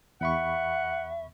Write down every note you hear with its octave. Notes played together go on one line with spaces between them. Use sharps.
E2 E5 F#5 B5 C#6